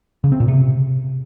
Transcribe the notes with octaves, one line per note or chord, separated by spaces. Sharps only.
C#3
C4
A#2
C3